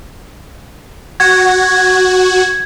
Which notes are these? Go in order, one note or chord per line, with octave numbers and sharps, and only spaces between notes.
F#4 G#6